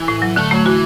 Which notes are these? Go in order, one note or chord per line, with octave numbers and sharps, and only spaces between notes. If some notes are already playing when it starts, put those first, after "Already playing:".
Already playing: E3
A2
F#3
D3 A3
F#3 A3
E3 F#4